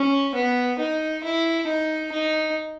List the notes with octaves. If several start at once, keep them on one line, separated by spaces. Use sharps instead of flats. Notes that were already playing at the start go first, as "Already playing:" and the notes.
Already playing: C#4
B3
D#4
E4
D#4
D#4